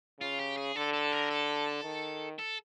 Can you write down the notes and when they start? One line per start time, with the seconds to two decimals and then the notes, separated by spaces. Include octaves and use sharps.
0.20 C#3 F4
0.39 G4
0.57 G#4
0.76 D3 A4
0.93 A4
1.12 A#4
1.30 A4
1.84 D#3
2.39 A4